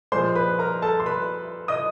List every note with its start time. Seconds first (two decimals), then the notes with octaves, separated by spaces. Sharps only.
0.12 A#2 F3 G#3 C5 C6
0.35 B4 B5
0.59 A#4 A#5
0.82 A4 A5
1.00 C6
1.06 B4 B5
1.68 D#5 D#6